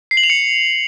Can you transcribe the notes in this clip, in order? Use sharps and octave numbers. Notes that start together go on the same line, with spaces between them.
C7
F#7
F7
C#7